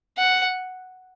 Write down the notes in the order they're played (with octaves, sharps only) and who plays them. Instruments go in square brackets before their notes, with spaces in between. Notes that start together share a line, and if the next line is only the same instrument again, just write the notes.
[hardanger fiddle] F#5